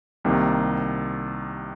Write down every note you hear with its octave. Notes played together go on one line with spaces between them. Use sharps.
C2 C3 D#3 A#3